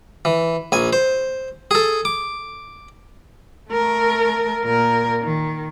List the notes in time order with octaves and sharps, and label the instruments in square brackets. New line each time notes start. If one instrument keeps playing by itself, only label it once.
[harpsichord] E3
A#1 G#5
C5
G#4 A4
D6
[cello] A3 A#4
A#2 A#4
D#3